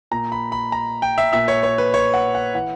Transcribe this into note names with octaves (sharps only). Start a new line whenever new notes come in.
A#2 A#5
B5
B5
A#5
G5
E5
A#2 E5
C#5
C#5
B4
C#5
F#5
F#5
E3 F#5